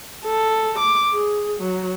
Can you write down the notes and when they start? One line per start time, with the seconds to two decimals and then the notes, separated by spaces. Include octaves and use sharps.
0.25 A4
0.79 D6
1.13 G#4
1.60 F#3